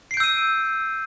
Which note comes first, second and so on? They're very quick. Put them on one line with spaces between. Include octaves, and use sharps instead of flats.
C7 D7 G6 E6 D#7